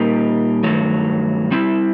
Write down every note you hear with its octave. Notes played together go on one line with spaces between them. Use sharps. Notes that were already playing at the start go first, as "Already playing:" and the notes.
Already playing: A#2 G3 A#3 D#4 G4
G2 D#3 F#3 A3
G3 C4 E4